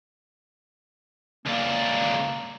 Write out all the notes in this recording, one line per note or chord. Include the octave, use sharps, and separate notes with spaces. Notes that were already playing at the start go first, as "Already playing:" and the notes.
C#2 A#3 D4